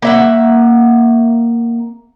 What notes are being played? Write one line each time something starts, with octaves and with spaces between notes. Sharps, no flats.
A#3 E5 F#5